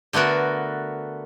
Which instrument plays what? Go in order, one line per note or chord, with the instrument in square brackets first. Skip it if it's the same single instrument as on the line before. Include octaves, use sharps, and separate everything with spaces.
[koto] D3 A3 B3 F#4 A#4